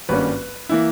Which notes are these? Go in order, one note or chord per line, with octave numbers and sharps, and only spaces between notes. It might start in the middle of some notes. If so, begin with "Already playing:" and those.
G#1 G2 G3 A#3 C#4 B4
E3 A#3 E4